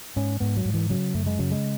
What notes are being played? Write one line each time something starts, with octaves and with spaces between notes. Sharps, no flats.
G#2 C#4
G#2 B3
F#3
G#2
E3
C#3 F#3
F#2 A3
G#3
C#3 F#3
G#3